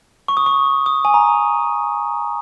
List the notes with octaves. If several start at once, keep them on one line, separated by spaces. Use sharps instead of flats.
C#6
D#6
C#6
D#6
G#5
A#5